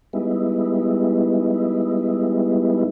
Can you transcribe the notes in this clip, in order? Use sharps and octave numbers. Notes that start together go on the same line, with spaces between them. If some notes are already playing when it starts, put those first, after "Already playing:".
G3 G#3 B3 D#4 E4